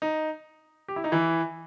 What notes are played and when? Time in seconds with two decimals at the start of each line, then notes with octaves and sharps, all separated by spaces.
0.02 D#4
0.88 G4
0.96 E4
1.04 D#4
1.12 E3 E4